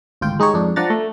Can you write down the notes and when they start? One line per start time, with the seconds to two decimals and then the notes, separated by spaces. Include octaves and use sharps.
0.21 G#1 D2 F4 G5
0.39 G#3 D#4 G4 C#5
0.54 F2 G#2 D4
0.76 F3 D4 F#5 A#5 A6
0.90 A3